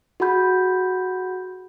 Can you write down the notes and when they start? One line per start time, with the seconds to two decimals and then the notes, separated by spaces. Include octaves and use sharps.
0.20 F#4 G#4 F#5 B5 G6